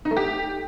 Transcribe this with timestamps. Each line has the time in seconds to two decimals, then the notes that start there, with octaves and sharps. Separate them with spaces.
0.05 D#4
0.11 A3
0.17 G4